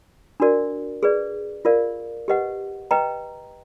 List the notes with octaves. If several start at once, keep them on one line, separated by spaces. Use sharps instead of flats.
D4 F#4 A#4 D5
G#4 B4 D5
F4 A#4 D5 F5
G4 B4 D#5 F#5
B4 D#5 G5 A#5